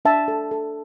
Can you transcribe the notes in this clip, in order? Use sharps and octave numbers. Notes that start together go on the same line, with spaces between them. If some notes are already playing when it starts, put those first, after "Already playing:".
D4 E5 A5
A4
A4